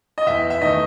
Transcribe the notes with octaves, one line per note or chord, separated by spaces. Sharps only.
D#5
E2 E5
E5
D#3 A3 D#5